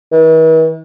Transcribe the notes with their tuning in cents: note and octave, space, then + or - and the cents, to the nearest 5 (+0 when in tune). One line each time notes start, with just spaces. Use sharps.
E3 -45